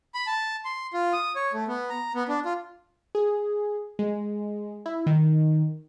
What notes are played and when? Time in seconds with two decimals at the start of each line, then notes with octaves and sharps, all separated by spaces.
0.14 B5
0.27 A5
0.65 C6
0.94 F4
1.13 D#6
1.36 C#5
1.53 A3
1.68 B3
1.90 A#5
2.15 B3
2.29 D4
2.45 F4
3.15 G#4
3.99 G#3
4.86 E4
5.07 D#3